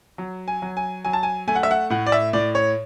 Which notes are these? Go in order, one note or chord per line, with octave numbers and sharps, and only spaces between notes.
F#3
G#5
F#3
G#5
F#3 G#5
A5
G#5
A3 G#5
F#5
E5
F#5
A2 F#5
D5
E5
A2 D5
C#5